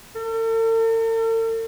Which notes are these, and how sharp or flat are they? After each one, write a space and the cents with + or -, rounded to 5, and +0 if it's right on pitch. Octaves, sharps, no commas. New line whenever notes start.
A4 +45